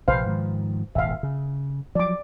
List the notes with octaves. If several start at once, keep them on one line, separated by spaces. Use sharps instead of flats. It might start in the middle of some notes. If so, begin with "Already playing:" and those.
A#1 C3 F3 B4 C5 F5
G#2 D#3 F3
D#1 G#1 E5 F5
C#3
F3 F#3 D5 D6